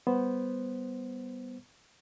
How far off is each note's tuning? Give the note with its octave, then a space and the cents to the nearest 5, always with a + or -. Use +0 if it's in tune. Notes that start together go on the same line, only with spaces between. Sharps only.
G3 +0 B3 +0 C5 +0